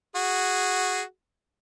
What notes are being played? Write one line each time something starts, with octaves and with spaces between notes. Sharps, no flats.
F#4 G#4